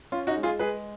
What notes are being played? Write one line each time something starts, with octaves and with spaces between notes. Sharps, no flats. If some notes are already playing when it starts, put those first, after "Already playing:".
C#4 F4
D#4 F#4
G#3
F4 G#4
G#3 G#4 B4